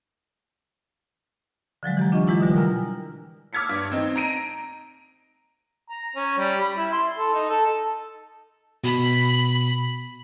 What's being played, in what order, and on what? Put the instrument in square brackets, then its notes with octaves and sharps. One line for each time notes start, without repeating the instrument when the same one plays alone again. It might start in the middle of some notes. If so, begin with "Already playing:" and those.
[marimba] D3 F3 F#3 G#3
E3 G4 A#5
D4 F4 D#5 C#6
E3 F#3 G#3 E4 F4
B2 D3 G3
A#4 G5 G#5 A#5 F6
[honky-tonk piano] D6 E6 F6 G#6 B6 C#7
G2
C4 D#4
A#5 D7 D#7
[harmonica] A#5
C#4
G3
B5
E4
C6
A4
D#4
A4
[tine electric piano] B2 [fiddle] B5